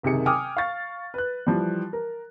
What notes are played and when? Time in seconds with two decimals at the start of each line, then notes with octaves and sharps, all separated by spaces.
0.03 F#1 C3 D#3 G#4 C#7
0.26 G5 G#5 D6 D#6 F6
0.57 F5 C#6 A6
1.14 B4 F#6
1.47 E3 F3 G3
1.93 A#4